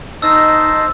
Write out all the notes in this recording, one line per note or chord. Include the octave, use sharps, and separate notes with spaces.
D#4 C5 D#5 A5 E6